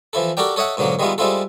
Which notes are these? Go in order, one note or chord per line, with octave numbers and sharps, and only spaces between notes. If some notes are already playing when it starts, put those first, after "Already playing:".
E3 F3 E4 A4
F#4 G4 A4 A#4 D5 G5
A4 C#5 D#5 E5 F#5
G#2 B2 D3 F#3 A#3
D#3 G3 G#3 B3 E4 F4
G3 G#3 C4 E4 F4 A4